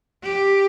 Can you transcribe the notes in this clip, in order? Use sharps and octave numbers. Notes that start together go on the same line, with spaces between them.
G4